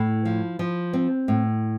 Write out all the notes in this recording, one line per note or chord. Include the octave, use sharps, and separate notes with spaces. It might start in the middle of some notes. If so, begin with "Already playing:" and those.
Already playing: A2
F3
F3
C4
A2